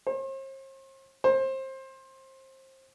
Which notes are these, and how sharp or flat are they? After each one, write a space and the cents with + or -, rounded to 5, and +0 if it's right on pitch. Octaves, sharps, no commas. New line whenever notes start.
C5 +45
C5 +25